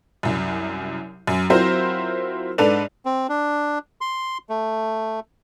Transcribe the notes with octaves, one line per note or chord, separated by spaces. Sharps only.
C2 F#2
F#2
F#3 C4 E4 F4 A#4 C5
G#2 D4 A4 B4 D5 F7
C4
D4
C6
A3